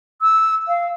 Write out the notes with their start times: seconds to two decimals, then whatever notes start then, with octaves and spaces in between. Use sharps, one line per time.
0.21 E6
0.67 F5